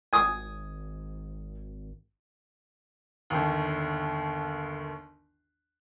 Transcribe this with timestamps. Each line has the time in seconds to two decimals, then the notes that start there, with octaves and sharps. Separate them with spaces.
0.13 G#1 G#5 D#6
3.30 G1 D#2